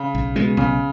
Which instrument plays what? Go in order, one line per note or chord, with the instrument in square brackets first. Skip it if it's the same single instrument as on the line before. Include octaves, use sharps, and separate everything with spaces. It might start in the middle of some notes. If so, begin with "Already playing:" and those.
Already playing: [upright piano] C#3
[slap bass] B1
B2 G#3
[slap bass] B1 [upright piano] C#3